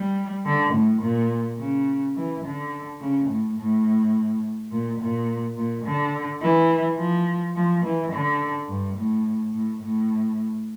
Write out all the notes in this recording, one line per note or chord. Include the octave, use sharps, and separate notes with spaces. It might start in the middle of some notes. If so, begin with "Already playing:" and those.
Already playing: G3
D3
A2
A#2
C#3
E3
D3
C#3
A2
A2
A#2
A#2
A#2
D3
E3
F3
F3
E3
D3
G2
A2
A2
A2